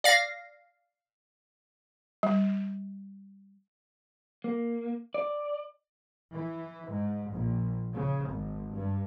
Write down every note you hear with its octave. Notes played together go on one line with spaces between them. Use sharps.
D5 F5 A#6
G3
A#3
D5
E3
G#2
A#1
C#3
G#1
G2